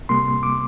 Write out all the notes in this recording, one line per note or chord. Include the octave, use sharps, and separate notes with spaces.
C3 G3 A#3 C6
D6